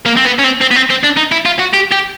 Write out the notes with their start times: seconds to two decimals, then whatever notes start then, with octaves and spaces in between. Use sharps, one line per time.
0.06 A#3
0.16 C4
0.25 B3
0.39 C#4
0.44 C4
0.61 C4
0.71 B3
0.76 C4
0.90 C4
1.04 D4
1.17 D#4
1.32 E4
1.45 F4
1.59 F#4
1.73 G4
1.92 G4